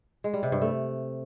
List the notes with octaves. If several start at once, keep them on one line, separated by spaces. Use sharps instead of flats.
G#3
G3
C3
G2
A3